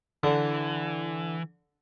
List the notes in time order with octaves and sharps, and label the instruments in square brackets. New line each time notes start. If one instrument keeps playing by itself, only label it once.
[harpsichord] D3 [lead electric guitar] E3